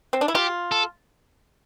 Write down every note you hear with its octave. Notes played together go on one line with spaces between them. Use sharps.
C4
D4
E4
F4 G4
A4